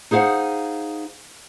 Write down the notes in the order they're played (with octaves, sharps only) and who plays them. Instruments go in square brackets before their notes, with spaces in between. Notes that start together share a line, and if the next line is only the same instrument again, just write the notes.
[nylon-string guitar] D#4 G#4 C5 F5 F#5